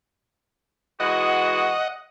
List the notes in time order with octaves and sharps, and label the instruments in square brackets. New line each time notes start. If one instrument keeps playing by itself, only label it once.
[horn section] E3 G#3 F#4 [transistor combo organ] D#5 F#5